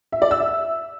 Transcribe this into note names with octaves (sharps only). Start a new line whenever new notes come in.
E5
D5
E6
E5